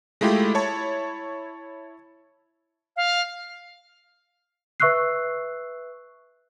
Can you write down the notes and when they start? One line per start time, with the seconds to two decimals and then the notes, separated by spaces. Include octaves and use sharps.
0.21 G#3 A3 E4 F4 G4
0.54 E4 C#5 A5 C#6
2.97 F5
4.80 B4 E5 C#6 E6 F#6 C7